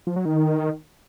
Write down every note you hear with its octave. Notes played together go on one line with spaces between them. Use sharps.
F3
F#3
D#3